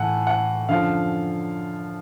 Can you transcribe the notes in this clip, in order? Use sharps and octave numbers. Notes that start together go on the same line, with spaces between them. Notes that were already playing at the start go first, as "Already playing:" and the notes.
Already playing: A2 E3 F#5 G#5 A5
F#5
F#2 D3 F3 F5